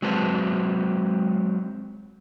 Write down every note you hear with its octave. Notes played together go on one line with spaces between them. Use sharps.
F#3 G#3 C4 B4 A5